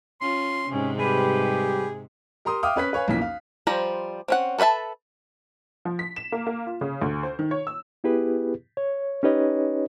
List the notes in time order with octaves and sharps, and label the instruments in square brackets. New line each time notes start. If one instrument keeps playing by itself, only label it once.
[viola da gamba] C#4 F4 [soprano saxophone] C6
[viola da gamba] G#2 C3 [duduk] C#4
[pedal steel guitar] G3 B4 [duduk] G4 [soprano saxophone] G#4
[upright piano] G4 A#4 A#5 C6 D#6
E5 F5 G5 D6 D#6 F6
C#4 B4 F#6 B6
B4 C#5 F5 G#5
B1 F2 E3 A#3 C#4 B6
F5
[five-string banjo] F3 G3 C5 A#5
C4 C#4 F#5
A4 B4 C#5 E5 A5
[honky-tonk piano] F3
B6
E7
A#3
A#3
F4
C#3
D2
C5
D#3
C#5
E6
[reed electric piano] B3 E4 G4 G#4 B4
C#5
C#4 D#4 G4 B4 C#5 D#5